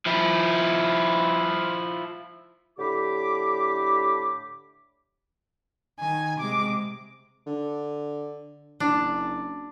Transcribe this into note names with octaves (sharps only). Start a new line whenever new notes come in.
F3 E4
A2 D3 G4 B5 D6
D#3 G#5
C3 G#3 D6
D3
F#1 D4